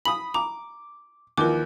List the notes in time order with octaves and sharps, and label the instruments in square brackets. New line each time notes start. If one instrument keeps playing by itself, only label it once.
[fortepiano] B5 D#6 [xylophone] F#7
[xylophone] A#5 [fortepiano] D6
[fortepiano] D#2 E3 F3 [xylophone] A#4 D6